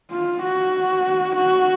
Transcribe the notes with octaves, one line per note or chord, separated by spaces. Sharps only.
F4
F#4
F#4